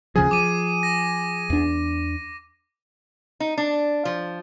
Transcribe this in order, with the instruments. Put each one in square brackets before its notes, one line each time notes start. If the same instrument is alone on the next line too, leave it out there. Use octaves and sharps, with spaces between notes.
[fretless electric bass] D2 C#3 F3 [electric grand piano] G#4 G#5
[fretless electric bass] F3 [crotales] D6 D#7
[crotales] A#6
[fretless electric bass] E2 D4
[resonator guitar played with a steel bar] D#4
D4
F3